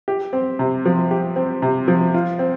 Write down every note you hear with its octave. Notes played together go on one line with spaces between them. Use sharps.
G4
C4
C3
F3
G4
C4
C3
F3
F4
C4